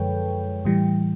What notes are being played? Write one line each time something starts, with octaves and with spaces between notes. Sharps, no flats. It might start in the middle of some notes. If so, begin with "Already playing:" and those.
Already playing: F#2 D3 F3 G#3 A4 B4 C#5 G5
A2 E3 G3